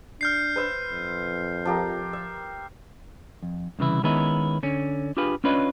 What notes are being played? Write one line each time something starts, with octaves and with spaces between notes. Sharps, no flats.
D4 F6 G6 C7
B4 C5 E5
F2
F3 G4 A#4
E5
F2
C2 C#3 E3 E4
D#3 G#3 B3 C#4 D#4 E4
D3 C#4
D4 F4 G4 G#4 B4 F5
C#4 D4 F4 B4 C#5 D#5